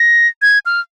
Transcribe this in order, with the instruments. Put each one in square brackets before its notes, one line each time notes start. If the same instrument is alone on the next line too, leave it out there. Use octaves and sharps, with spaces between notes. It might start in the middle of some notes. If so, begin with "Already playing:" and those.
Already playing: [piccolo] A#6
G#6
F6